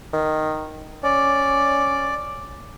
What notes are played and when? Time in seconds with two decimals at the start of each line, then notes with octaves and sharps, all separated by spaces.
0.13 D#3
1.03 C#4 D5